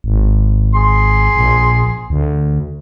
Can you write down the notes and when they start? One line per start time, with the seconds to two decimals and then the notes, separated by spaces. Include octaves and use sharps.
0.04 G#1
0.75 G#4 C6
1.36 A#1
2.10 D2